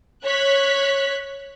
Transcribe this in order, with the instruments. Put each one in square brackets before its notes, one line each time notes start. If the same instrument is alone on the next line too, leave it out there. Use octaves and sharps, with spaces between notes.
[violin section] C#5 F#6 B6